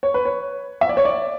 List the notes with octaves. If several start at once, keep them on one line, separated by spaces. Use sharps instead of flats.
C#5
B4
C#5
E5
D5
C#5
D5